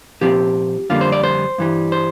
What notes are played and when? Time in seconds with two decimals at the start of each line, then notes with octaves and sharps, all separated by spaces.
0.21 A#2 F3 C4 G4
0.90 F2 D3 G3 A#3 F4
1.01 C5
1.12 D5
1.24 C5
1.58 G2 E3 G3
1.92 C5